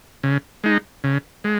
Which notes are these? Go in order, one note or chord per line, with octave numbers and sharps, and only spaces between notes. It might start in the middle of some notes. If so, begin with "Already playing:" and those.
C#3
G#3 D#4
C#3
G#3